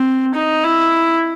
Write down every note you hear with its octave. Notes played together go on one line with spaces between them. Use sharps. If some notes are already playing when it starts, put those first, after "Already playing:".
Already playing: C4
D#4
E4